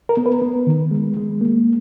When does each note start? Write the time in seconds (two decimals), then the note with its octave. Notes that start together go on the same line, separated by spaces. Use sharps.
0.09 A#4
0.17 B3
0.26 B4
0.42 B3
0.67 D#3
0.91 G#3
1.17 G#3
1.41 A#3